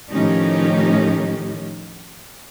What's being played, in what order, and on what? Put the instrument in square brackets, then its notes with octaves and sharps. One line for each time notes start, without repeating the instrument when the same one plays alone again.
[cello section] A2 D#3 F3 C#4 D#4 G4